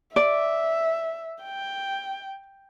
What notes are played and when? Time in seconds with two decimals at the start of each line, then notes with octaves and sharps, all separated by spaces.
0.16 D5 E5
1.43 G5